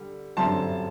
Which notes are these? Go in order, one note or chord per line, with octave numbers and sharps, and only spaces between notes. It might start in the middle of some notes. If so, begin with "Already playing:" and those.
Already playing: D3 G3
F#2 D3 G3 C4 A5 C6